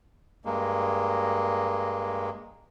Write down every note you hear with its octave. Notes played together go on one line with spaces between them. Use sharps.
G2 G#3 A#3